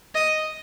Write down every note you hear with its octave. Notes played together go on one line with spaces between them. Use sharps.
D#5